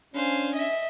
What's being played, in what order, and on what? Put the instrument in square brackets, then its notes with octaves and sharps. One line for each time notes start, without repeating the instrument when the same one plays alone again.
[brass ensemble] C#4 D4 [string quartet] C5 F5 G#5
[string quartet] D#5 E5